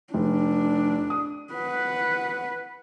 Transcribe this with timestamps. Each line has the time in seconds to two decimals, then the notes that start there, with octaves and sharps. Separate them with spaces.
0.14 F1 D4
1.10 D#6
1.54 B4 F#5